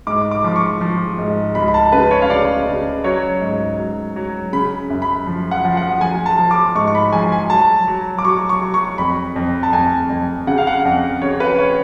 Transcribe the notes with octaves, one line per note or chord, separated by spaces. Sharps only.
G#2 D6
D6
F3 D6
C#6
F3
G#2
C#2 B5
B5
A5
C#3 B4
C#5
F5
C#3 D5
C#3
F#3 C#5
G#2
F#3
F#3
C#3 B5
F#2
B5
F3
F#5
F3
F#5
F3 G#5
A5
F3
D6
G#2 C#6
C#6
B5
F3 G#5
G#5
F#3 A5
F#3
D6
F#3 C#6
C#6
F#3
C#6
F2 B5
F2
A5
F2 G#5
F2
C#3 F#5
F5
F#5
F2
C#3 C#5
B4
C#5